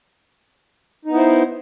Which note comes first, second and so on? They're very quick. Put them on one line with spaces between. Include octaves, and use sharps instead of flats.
D#4 B3 E4 C5